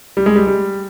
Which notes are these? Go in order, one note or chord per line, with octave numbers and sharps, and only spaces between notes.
G3
G#3
G3
G3